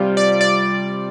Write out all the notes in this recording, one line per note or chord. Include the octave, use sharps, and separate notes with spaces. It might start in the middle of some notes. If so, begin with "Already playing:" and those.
Already playing: C3 G3 F4
D5
D5